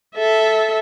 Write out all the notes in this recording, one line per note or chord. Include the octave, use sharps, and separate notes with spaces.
A4 E5